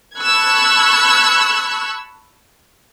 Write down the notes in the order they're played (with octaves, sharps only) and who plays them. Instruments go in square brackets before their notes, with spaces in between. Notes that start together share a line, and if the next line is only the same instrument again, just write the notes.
[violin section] A5 B5 C#6 E6 F#6 G#6